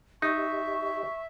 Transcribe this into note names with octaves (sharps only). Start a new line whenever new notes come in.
D#4 G4 D#5 E5 C#6